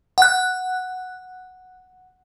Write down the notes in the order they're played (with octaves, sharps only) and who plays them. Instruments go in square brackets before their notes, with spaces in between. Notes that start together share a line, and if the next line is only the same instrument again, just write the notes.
[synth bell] F#5 F#6